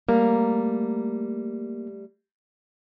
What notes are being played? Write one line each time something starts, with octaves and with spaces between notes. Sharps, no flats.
G3 A3 A#3 A#5